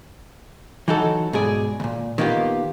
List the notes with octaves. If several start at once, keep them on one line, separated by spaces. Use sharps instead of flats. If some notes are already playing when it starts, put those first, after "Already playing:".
E3 F#3 D#4 F#4 A4
G#2 B2 G#4 D5
D2 A#2
D#3 A#3 B3 F4 G4